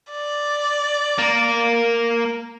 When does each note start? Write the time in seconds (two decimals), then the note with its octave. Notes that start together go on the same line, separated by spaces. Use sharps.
0.11 D5
1.18 A#3 A#4